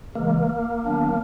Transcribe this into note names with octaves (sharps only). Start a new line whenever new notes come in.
C#3 E3 G#3 A#3
D#3 F#3 B3 D4